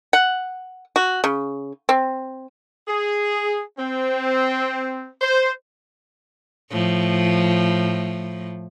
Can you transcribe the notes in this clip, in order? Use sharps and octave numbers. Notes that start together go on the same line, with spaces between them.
F#5
F#4
C#3
C4
G#4
C4
C5
A2 F3